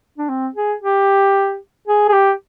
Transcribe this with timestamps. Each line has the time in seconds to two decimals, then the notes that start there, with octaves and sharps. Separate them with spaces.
0.18 D4
0.29 C4
0.55 G#4
0.82 G4
1.88 G#4
2.09 G#4
2.13 G4